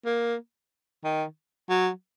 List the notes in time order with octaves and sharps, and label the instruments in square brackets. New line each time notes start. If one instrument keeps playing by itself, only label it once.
[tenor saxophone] A#3
D#3
F#3